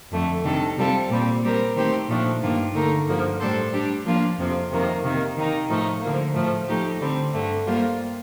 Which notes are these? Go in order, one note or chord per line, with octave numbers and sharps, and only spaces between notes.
F2 D3 A3
C3 D#3 G3 D4 A4
C3 G3 C4 F4 A4
A#2 G3 C4
G3 C4 G4 A#4
D#3 A3 C4 G4 C5
A#2 F3 A3 D4
G2 D#3 A#3 D4 F4
D3 A3 D#4 A#4
G2 D3 F3 A#3
A2 G3 D4 A4 C5
G3 D4 G4
F3 A#3 D4 F4
F2 C3 F3 C4
F2 C3 D#3 A#3
C3 D#3 A#3
D#3 A#3 D#4
A2 F3 A3 D#4
D3 F3 A#3
A2 F3 A3
F3 A3 D#4 G4
D3 G3 C4
G2 D3 A3
G3 A#3 F4 C5